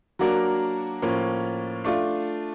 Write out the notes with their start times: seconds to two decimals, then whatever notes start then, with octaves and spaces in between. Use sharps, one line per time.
0.19 F#3 A#3 D4 F#4 A#4
1.02 A2 F3 A#3 C#4 F4
1.84 A3 D4 F4